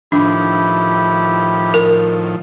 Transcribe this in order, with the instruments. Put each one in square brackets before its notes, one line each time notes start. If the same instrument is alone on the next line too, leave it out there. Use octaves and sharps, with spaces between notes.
[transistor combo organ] A2 D#3 F3 [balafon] D4 [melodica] E4 G4
[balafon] A#4